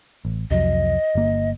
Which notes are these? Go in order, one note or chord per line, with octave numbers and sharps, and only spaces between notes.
A1
C2 F2 F#3 D#5
G1 A#3